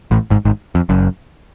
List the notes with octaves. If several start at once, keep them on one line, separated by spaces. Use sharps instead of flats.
A1 A2
G#1 G#2
G#1 G#2
F2
F#1 F#2